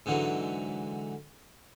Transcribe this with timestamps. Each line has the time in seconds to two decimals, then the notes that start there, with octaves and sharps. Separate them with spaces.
0.06 G#2 D3 E3 F#3